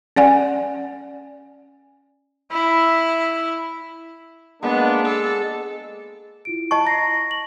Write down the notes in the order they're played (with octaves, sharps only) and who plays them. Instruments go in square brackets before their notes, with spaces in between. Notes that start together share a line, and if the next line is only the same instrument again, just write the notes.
[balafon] C#4 D5 F#5 G#5
[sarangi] E4
[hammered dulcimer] G#3 [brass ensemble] A#3 D4 [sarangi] B3
[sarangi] A4
[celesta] E4 F4 D7
[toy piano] D#5 A5 C#6
[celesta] A#5 A#6 C7
F#7